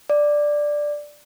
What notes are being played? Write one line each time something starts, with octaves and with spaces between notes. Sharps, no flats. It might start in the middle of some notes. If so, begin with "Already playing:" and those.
D5